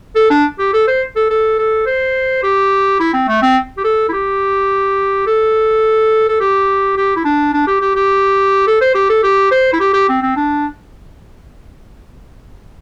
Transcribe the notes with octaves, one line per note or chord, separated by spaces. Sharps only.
A4
D4
G4
A4
C5
A4
A4
A4
C5
G4
E4
C4
A3
C4
G4
A4
E4
G4
A4
A4
G4
G4
E4
D4
D4
G4
G4
G4
A4
C5
G4
A4
G4
C5
E4
G4
G4
C4
C4
D4